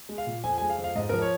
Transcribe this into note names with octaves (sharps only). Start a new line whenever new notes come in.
G#3
F5
A#2
F2 G#5
G#3 G#5
F5
F2
F5
G#2 D#5
F3 A#4
C#5